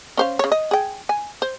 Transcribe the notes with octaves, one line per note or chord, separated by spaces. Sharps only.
C#4 C5 F5
C#3 C#5
D#5
G#4 G5
G#5
C5